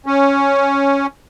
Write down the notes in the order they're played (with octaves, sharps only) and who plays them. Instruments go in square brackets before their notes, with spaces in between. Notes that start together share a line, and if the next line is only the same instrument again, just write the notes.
[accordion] C#4